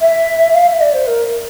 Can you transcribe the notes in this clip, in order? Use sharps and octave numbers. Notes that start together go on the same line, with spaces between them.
E5
F5
E5
D5
C5
A#4